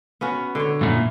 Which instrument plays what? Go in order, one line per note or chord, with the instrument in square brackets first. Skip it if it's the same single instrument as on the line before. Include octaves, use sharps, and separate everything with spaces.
[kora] B3 C#4 F#4
D3 C#5
[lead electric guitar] F#2 A#2 [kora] E4